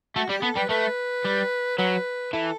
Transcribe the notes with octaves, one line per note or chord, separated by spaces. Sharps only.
A3 F#4
G3 G4
B3 A4
G3 B4
A3 B4
G3
F#3 B4
E3 A4